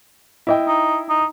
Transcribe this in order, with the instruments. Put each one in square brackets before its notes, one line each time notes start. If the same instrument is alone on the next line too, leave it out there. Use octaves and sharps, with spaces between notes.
[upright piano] E4 D#5 G5
[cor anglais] D#4
D#4